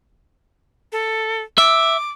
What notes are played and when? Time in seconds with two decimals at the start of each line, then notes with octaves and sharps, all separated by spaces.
0.92 A4
1.58 E5 D6